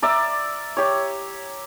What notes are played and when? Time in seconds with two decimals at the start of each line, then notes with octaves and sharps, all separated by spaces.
0.02 A#4 D5 E5
0.77 G4 C#5